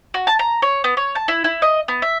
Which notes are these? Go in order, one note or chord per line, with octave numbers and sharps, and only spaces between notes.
F#4
A5
A#5
C#5
B3
C#5
A5
E4
E4
D#5
B3
E5